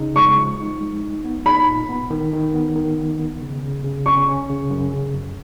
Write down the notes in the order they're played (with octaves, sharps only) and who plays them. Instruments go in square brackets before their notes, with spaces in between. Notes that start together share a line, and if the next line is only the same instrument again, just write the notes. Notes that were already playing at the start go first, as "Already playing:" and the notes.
Already playing: [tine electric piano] C#3 D#4
[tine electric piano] G#3 [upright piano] C#6
[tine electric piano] F3
D#4
G#3
D#4
B3
[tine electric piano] D#4 [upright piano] B5
[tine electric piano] A#2
B3
D#3
D#3
B3
D#3
B3
B3
C#3
C#3
C#3
[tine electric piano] C#4 [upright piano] C#6
[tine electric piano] C#4
C#3
F#2
C#3
F#2